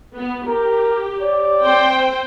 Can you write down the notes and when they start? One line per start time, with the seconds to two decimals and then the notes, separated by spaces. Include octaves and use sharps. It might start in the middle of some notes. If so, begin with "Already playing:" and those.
0.14 B3
0.46 G4 A#4
1.20 C#5 D5
1.63 C4 C5 G5